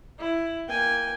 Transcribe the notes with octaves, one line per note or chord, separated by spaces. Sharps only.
E4
A#3 G5 G#5